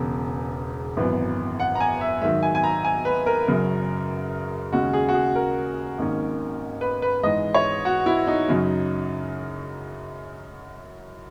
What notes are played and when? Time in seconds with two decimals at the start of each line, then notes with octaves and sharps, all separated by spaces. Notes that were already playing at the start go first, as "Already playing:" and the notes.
Already playing: E1 E2 C#3
0.97 G#1 F#2 E3 B3
1.60 F#5
1.75 A#5
1.80 G#5
2.01 E5
2.21 G#2 D#3 F#3 E5
2.43 G#5
2.55 G#5
2.63 A#5
2.85 G#5
3.05 B4
3.26 A#4
3.47 F#1 F#2 C#3 F#3
4.72 D#2 C#3 G#3 C#4 F#4
4.93 G#4
5.09 F#4
5.14 G#4
5.35 A#4
5.98 G#1 G#2 D#3 A#3 C#4
6.81 B4
7.02 B4
7.23 G#2 E3 G#3 D#5
7.54 C#5
7.85 F#4
8.06 E4
8.27 D#4
8.48 F#2 C#3 F#3